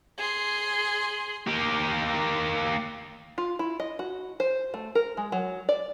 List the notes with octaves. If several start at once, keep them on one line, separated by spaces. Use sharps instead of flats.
G#4 C6
A#3 G4
F4
E4
D#5
F#4
C5
A3
A#4
G#3
F#3
D5